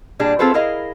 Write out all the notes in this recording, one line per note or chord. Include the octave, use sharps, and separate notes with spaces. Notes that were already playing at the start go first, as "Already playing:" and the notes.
A#2 G3 D4 G#4
C4 F4 G#4 A4 B4 C5
E4 G#4 A#4 D#5 F5